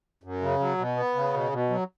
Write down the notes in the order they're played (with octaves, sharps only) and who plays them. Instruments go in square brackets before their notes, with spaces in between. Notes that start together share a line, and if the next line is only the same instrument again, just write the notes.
[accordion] F#2
C#3
F#3
B2
B3
C#3
B2
B2
F#3